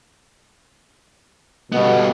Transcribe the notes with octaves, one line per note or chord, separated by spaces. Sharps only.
B2 G3 B3